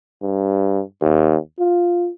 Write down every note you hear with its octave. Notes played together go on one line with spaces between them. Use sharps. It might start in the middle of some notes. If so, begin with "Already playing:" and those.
G2
D#2
F4